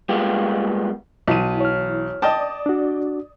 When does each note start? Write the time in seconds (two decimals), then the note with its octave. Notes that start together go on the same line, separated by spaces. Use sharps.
0.09 G3 G#3 A#3 B3 F4 G4
1.28 B1 E3 D#7
1.60 C#5 F6
2.22 D5 D#5 G5 A5 D#6
2.66 D4 F#4